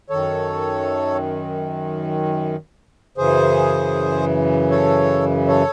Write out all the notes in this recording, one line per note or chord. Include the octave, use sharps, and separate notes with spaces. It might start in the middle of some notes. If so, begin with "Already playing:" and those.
F#2 D#3 A4 C#5
F#2 C#3 E3 G#4 C5
A4 C#5
A4 C#5